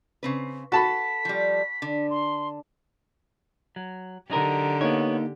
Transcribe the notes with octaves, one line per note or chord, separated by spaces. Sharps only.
C#3 C4 B4
F#4 A4 A5 B5 B6
F3 G3
D3
C6
F#3
D3 F#3 D#4 G4 A#4
A#3 B3 D#4 C#5